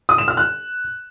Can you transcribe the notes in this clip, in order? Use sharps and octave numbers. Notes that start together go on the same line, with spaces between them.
D#6
E7
F6
F#6